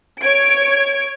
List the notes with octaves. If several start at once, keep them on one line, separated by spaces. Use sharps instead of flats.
C#5 G#6 D7